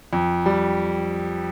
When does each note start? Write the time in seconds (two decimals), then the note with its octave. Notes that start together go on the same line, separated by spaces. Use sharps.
0.13 F2
0.46 G3